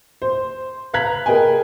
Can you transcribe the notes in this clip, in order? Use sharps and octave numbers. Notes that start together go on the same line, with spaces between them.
C5
B4 F5 A#5 F#6 G#6 B6
G#4 A#4 B4 D#5 G5 G#5